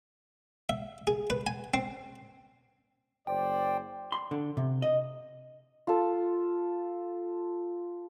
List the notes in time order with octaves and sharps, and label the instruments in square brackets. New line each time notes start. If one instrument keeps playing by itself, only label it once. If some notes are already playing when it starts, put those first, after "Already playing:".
[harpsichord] E5
G#4
B4
G#5
C4
[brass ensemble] F#1 C5 D5 [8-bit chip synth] G5
[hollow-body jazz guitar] C6
D3
C3
D#5
[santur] F4 A4